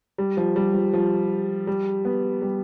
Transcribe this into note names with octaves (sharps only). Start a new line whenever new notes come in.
G3
F3
G3
F3
F3
G3
B3
G3